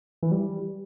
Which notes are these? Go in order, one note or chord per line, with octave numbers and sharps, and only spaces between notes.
E3
G3